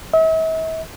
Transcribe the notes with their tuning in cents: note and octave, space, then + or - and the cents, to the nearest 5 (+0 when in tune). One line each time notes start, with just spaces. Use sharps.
E5 -45